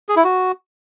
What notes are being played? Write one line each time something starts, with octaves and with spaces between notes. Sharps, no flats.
G#4
E4
F#4